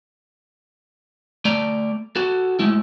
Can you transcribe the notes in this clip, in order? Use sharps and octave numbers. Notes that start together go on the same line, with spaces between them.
A3 D5 A#5
F#4 A4
G#3 A3 E4